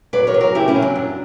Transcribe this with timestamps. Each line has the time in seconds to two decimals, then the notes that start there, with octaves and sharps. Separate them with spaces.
0.13 F#3 B4 D5
0.27 A#4 C#5
0.34 F#3
0.40 F#4 A#4
0.55 C#3 E4 G4
0.68 C#4 E4
0.76 F#3
0.82 D4
0.96 F#2